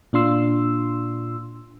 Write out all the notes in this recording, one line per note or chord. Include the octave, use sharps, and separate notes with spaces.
A#2 D4 F4 C6 E6